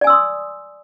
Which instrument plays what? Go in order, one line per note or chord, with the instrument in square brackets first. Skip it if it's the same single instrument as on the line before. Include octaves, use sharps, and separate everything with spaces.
[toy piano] D5
G#5
E6
C6
D#6